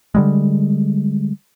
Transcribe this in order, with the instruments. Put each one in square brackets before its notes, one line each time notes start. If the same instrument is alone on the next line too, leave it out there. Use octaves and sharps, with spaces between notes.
[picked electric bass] D3 G3 G#3